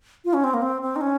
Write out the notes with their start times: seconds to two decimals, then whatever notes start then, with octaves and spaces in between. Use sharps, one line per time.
0.25 F4
0.34 C#4
0.44 C4
0.54 A#3
0.62 C4
0.82 C4
0.96 D#4
1.01 C#4